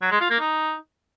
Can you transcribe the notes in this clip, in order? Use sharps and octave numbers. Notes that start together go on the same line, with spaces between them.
F#3
G#3
F4
A#3
D#4